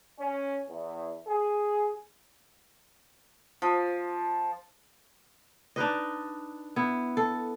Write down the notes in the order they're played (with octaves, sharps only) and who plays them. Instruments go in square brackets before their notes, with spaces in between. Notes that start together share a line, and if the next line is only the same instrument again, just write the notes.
[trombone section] C#4
E2
G#4
[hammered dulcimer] F3
[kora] D4 D#4 B4 D#5
B3 E4
A4